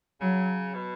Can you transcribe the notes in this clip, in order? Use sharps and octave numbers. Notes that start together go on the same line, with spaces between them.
C#3 F#3
B2